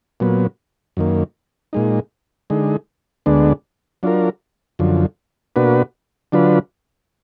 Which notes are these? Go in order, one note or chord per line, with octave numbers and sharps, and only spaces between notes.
A#2 F#3 B3
F#2 D#3 A#3
A#2 G#3 D#4
D3 G#3 D#4
D2 D3 G#3 B3 D4
F#3 D4 F4 A#4
F#2 D3 F3
B2 A#3 D4 F#4 B4
D3 F#3 D4 F4 B4